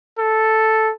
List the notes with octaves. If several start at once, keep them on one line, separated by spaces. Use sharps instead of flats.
A4